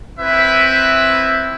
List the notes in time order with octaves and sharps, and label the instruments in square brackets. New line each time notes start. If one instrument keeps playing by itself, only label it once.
[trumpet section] C4 E4 B4 E5